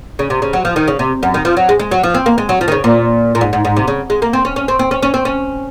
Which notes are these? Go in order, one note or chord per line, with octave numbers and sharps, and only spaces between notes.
C#3
C3
C#3
F#3
F3
D#3
C#3
C3
F#2
D#3
F3
F#3
G#3
G#3
F#3
F3
C4
A#3
G#3
F#3
F3
D#3
C#3
A#2
A#2
G#2
G#2
G#2
C3
C#3
G#3
A#3
C4
C#4
C#4
C4
C4
C#4
C#4
C4
C#4